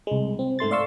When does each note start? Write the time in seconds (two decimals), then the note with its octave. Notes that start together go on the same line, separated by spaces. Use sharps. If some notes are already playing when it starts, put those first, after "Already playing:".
0.07 C2 G#3
0.39 C4
0.59 G#2 A3 C6 A6
0.71 D5 E5 F5 C6 C#6 E6